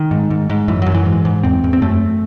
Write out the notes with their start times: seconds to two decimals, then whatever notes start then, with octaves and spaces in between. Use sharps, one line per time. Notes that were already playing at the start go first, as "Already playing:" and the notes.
Already playing: D#3
0.11 G#2
0.30 G#2
0.50 G#2
0.68 F#2 E3
0.82 F#2 F#3
0.94 E3
1.06 G#2
1.25 G#2
1.43 E2 C4
1.64 E2
1.73 C4
1.82 F#2 A3